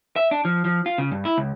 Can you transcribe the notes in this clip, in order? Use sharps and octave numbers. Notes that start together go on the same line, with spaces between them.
E5
D4
F3
F3
F4
C#3
G2
E4
C#2